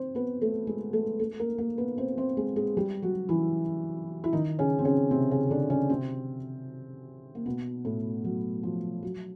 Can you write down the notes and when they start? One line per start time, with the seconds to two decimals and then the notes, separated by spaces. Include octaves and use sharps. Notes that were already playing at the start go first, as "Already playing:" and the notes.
Already playing: C4 C5
0.15 B3 B4
0.41 A3 A4
0.67 G#3 G#4
0.93 A3 A4
1.19 A3 A4
1.39 A#3 A#4
1.58 A#3 A#4
1.78 B3 B4
1.98 C4 C5
2.17 C4 C5
2.37 G#3 G#4
2.56 G#3 G#4
2.77 G3 G4
3.02 F#3 F#4
3.29 E3 E4
4.24 E4
4.33 D#3 D#4
4.59 C#3 C#4
4.79 C4
4.85 C#3 C#4
5.11 C3 C4
5.31 C#3 C#4
5.50 D3 D4
5.70 C#3 C#4
5.90 C3 C4
7.35 A#3
7.46 B2 B3
7.85 A2 A3
8.24 F#3
8.63 F3
9.03 F#3